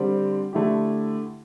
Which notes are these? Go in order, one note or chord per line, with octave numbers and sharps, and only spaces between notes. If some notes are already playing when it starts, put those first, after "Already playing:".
Already playing: D3 G3 C4
D3 A3 E4 G4